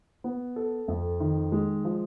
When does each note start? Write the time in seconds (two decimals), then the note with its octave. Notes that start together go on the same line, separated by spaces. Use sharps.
0.24 B3
0.56 A4
0.88 F2
1.20 D#3
1.52 G#3
1.85 F3